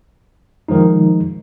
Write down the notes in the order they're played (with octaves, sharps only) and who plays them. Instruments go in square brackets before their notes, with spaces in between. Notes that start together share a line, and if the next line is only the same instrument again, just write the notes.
[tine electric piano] D#3 F3 G#3 D#4